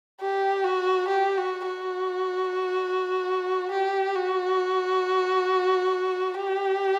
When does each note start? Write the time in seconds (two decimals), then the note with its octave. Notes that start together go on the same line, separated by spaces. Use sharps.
0.20 G4
0.64 F#4
1.08 G4
1.37 F#4
1.66 F#4
3.71 G4
4.15 F#4
6.34 G4